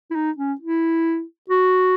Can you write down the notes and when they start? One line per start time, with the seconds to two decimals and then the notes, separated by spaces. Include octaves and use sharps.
0.11 E4
0.15 D#4
0.37 C#4
0.60 E4
1.50 F#4